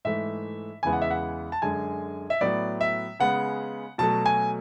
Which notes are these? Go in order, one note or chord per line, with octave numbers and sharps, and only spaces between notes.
G#2 E3 A3 E5
E2 C#3 E3 G#3 B3 G#5
F#5
E5
F#5
A5
F#2 D3 G#3 G#5
E5
A2 F#3 B3 D5
E5
C#3 G#3 B3 F#5
B2 F#3 A3 A5
G#5